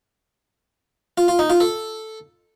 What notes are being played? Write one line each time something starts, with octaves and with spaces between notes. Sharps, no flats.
F4
F4
D#4
F4
A4